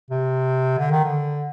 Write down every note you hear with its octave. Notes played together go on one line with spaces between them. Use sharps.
C3
D3
D#3
D3